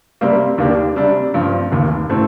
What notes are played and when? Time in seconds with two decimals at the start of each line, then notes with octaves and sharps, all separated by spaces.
0.21 C3 G3 A#3
0.58 D#2 D#3 A#3 D4 G4
0.96 C3 G3 D4
1.34 G2 F3 C4
1.71 F1 D#2 D#3 A#3
2.10 A2 A3 C4